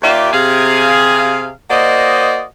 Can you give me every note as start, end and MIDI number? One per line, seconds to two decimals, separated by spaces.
0.02 0.32 39
0.02 0.32 63
0.02 0.32 65
0.02 0.32 67
0.02 0.32 74
0.02 0.32 76
0.32 1.49 48
0.32 1.49 68
0.32 1.49 77
1.70 2.43 58
1.70 2.43 66
1.70 2.43 72
1.70 2.43 74
1.70 2.43 75